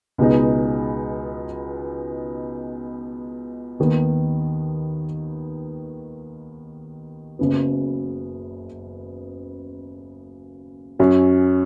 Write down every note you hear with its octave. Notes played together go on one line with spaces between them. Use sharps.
C#2 B2 G#3 B3 D#4
D#2 D#3 B3
F#1 F#2 C#3 F#3 B3
F#2 F#3 C#4